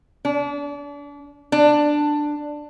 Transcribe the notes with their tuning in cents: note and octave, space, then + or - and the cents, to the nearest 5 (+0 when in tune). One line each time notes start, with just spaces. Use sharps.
D4 -35
D4 +10